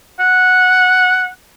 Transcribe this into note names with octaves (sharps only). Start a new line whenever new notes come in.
F#5